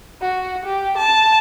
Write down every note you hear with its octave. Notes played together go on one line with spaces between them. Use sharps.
F#4
G4
A5